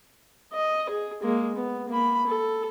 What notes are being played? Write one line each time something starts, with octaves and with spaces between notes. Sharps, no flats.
D#5
G#4
G#3 A#3
B3
A#3 B5
A4